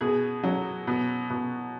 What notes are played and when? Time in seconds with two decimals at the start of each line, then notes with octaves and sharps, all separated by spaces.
0.01 B2 G#4
0.43 F#3
0.87 B2
1.30 B2